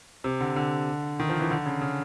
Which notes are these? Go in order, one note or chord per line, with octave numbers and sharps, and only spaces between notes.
C3
D3
D3
D#3
F3
E3
D3
C#3
C#3